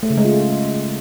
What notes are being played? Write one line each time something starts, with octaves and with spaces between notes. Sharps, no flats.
A3
C#3
G#3
F4